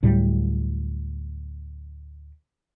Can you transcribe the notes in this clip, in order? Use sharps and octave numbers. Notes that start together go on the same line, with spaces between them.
D2 A2 F#3 G3